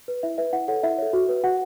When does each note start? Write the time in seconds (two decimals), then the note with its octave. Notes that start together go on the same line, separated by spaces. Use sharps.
0.08 B4
0.23 E4 E5
0.38 B4 E5
0.53 E4 F#5
0.68 A4 C#5 F#5
0.83 E4 E5
0.98 A4 C#5
1.13 F#4
1.29 B4
1.43 F#4 F#5